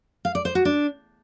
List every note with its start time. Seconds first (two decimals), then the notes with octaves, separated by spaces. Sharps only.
0.25 F5
0.35 D5
0.45 C5
0.55 F#4
0.65 D4